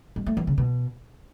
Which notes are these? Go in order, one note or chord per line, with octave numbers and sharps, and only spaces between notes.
G#3
A3
E3
C#3
B2